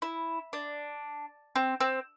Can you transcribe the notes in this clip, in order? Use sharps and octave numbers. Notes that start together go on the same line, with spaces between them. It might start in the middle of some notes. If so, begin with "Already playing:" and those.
E4
D4
C4
C4